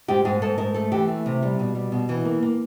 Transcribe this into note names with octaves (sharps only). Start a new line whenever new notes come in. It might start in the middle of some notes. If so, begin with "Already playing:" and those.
G#2 G4
G#2 G#4
G#2 A4
G#2 A#4
A3 A4
E3 G4
A3
C3
G3
B2
G3
B2
E3
A#3
A#3